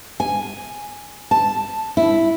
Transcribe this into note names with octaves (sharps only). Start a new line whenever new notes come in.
G#5
A5
E4